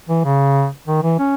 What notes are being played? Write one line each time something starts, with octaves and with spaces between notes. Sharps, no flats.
E3
C#3
D#3
E3
C#4